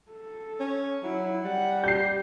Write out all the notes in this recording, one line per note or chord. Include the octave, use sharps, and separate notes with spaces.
A4
C#4
F#3 E4
G3 F#5
G4 G6 C7